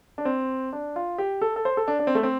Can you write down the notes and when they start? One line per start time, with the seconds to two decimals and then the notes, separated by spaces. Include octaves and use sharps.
0.18 D4
0.25 C4
0.73 D4
0.96 F4
1.18 G4
1.42 A4
1.56 A4
1.65 C5
1.77 A4
1.88 D4
2.00 D4
2.07 C4
2.15 A3
2.23 C4